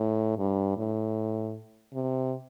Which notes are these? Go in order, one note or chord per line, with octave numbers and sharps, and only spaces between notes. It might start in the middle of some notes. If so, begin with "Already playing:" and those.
Already playing: A2
G2
A2
C3